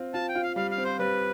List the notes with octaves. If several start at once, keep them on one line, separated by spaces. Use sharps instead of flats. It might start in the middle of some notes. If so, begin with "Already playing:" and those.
Already playing: C4 F4
F4 A5
G5
F4
F5
G3 F5
F5
C4
C5
G3 B4